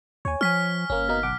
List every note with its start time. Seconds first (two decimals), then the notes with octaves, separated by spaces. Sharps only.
0.25 D#2 C#5 G#5
0.41 F3 C#5 G#5 F6 B6
0.90 G1 A#3 C#4
1.08 B2 A#3 D#4
1.23 B1 F#5 D6